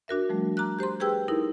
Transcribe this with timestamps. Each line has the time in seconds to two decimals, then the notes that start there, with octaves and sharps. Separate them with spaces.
0.08 D4 F#4 A#4 E5
0.29 F3 G3 A3
0.57 A#5 D6 F6 F#6
0.79 G4 C5 A#5 C6
1.00 G4 G#4 B4 G5 E6
1.28 D#4 E4 A#4